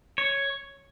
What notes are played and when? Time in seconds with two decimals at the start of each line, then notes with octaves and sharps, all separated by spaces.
0.18 C#5